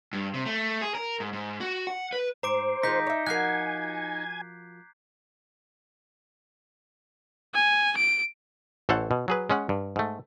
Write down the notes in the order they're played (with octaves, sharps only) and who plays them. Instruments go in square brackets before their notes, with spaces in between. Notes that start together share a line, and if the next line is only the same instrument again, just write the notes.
[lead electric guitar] G2
C3
A3
G#4
A#4
G#2
G#2
F#4
F#5
B4
[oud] G#2 [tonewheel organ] C5 [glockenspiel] A#5 D6 D7
[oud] D#3 G#3 F4 [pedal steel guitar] D#4 [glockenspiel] G6 B6
[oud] C#5 E5
[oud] F3 F#4 A#4 [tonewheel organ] G#5 [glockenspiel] F#6 G#6 C7
[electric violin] G#5
D7
[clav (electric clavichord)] A1 E3 A4 C5 C#5 F#5
B2
F#3 G#4 B4
G#3 C#4 F#5
G2
G#2 A3